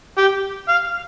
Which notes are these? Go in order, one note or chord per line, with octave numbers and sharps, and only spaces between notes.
G4
F5